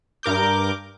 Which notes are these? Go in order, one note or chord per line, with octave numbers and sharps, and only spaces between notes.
G2 A#4 D6 G6